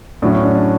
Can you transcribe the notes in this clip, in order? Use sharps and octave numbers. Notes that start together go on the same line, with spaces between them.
A2 F#3 C#4 D4
C#4
D4
D4